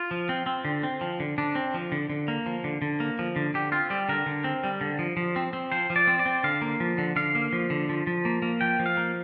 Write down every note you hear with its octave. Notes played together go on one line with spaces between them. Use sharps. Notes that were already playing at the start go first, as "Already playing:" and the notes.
Already playing: F4
F3
C4
C4
D3
C4
F3
D3
D3 D4
C4
F3
D3
D3
A#3
F3
D3
D3
A#3
F3
D3
D3 G4
C4 F4
G3 G4
D3 A#4
D3
C4
G3
D3
F3
F3
C4
C4
F3 C5
F3
D5
C4
D5
C4
D3 F5
A#3
F3
D3
D3 F5
A#3
F3
D3
F3
F3
A#3
A#3
F3 G5
F3
F5
A#3